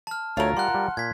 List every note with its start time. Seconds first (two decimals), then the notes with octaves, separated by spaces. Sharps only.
0.07 A5 F6
0.37 D2 A3 F4 A#4 C#5
0.57 G3 F#5 C6 F#6
0.70 G3 A5
0.97 A#2 G#6 B6